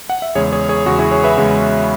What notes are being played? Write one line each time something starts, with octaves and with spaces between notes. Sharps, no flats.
F#5
E5
E2 C#3 G#3 G#4 C#5
G#4 C#5
G#4 C#5
E2 C#3 G#3 F#4
E4 G#4
G#4 C#5
B4 E5
E2 C#3 G#3